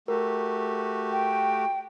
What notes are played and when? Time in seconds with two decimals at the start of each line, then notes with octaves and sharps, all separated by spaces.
0.08 A3 F#4 G4 A#4
1.12 G5